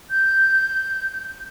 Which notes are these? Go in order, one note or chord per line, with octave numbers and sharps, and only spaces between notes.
G6